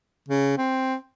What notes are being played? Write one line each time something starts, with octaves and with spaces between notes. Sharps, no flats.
C#3
C4